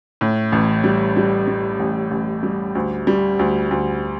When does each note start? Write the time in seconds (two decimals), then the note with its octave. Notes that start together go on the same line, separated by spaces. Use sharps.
0.21 A2
0.52 A1
0.84 G3
1.16 G3
1.47 G3
1.80 A1
2.11 A1
2.43 G3
2.75 D2
3.07 G3
3.39 D2
3.71 D2